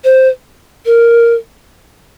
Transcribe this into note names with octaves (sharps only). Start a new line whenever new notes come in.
C5
A#4